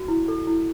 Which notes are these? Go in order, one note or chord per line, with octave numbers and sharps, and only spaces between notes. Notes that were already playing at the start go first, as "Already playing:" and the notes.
Already playing: F#4
E4
A4
E4